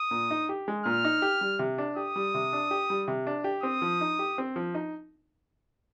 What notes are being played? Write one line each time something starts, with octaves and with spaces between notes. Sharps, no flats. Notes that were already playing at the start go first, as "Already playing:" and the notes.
Already playing: D#6
A#2
D#4
G4
G#3
A#2 F6
D#4
G4
G3
C3
D4
G4 D#6
G3
C3
D4
G4
G3
C3
D4
G4
C4 D#6
F3
D#4
G4
C4
F3
D#4